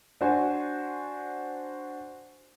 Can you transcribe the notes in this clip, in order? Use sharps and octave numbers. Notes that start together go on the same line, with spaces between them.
D4 F#4 C5 G#5